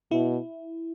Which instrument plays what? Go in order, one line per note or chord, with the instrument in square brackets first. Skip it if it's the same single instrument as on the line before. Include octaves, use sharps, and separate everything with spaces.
[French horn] B2 [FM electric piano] E4